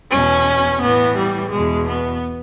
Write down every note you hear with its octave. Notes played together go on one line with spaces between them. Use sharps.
E2 B2 C#4
A2 E3 B3
G3
E2 B2 G#3
B3